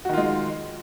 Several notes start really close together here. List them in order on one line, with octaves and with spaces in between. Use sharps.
F#4 D#3 F4 G#3